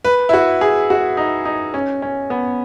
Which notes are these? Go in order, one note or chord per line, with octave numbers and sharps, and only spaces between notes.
B4
E4
F#4
G#4
F#4
D#4
D#4
C#4
C#4
B3